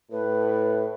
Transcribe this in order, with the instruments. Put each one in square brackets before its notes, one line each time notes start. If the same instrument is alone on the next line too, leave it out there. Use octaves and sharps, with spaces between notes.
[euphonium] A2 [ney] B4